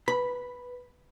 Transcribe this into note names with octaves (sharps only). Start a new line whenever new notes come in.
B4 B5